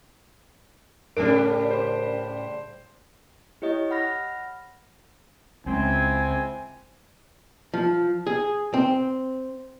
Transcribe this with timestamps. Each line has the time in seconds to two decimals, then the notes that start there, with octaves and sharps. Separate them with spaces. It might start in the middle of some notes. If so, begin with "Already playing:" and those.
1.17 A2 C#3 G3 C#4 D4 A#4 D7
1.71 C5
3.62 E4 G4 C#5 D#5
3.91 F#5 B5 F6 A#6
5.66 C#2 G#3 C4 E4 G#5
7.74 F3
8.27 G#4
8.74 C4